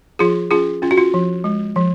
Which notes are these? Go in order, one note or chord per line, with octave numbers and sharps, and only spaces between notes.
F3 F4 G#4
C#4 F4 G#4
C#4 F4
F#4
F4
F3
G#3
F3